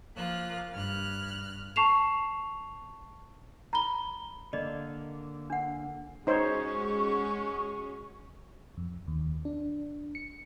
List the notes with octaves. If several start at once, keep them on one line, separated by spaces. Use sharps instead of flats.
F3 A#3 F4 F#6
G2 F6 F#6
A5 C#6 C7 E7 F7
A#5 B5 G7
D3 A#3 D5 D#5
D4 F#5
G#3 C#4 D#4 F#4 C5 C#5 C#6
F2
D#2
D4
C#7